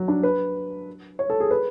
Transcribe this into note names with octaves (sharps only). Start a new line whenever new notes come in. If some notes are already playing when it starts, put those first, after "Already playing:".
Already playing: F#3
D4
B4
C#5
A4
G#4
B4